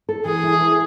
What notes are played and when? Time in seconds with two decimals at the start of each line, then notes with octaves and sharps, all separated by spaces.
0.09 A4
0.25 E3 G#4
0.43 E4
0.61 B4